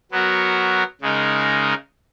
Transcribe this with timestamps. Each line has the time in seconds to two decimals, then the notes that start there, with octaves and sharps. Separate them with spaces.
0.12 F#3 B3 F#4 A#4
1.01 C#3 G#3 D#4 A#4